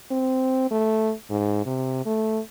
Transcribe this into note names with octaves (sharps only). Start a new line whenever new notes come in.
C4
A3
G#2
C3
A3